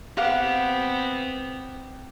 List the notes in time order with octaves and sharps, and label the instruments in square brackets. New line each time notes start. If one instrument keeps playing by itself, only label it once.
[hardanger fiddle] B3 C4 [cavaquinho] G4 F5 F#5